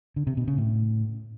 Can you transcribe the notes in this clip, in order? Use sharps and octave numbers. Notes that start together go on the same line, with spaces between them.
D3
C3
B2
C#3
A2